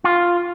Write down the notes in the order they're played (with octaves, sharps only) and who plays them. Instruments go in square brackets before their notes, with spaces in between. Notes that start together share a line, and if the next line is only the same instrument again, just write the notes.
[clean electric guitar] F4